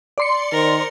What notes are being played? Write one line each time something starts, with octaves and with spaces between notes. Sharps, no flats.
D5 C6 C#7
D#3 A#4 C5